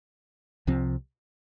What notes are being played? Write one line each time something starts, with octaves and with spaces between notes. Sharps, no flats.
C2 C3 F3 C4